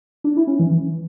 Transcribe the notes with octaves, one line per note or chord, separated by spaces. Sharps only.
D4
E4
C#4
E3
E3